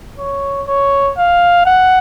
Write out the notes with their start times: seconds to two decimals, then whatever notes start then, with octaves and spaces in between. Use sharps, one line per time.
0.19 C#5
0.68 C#5
1.18 F5
1.66 F#5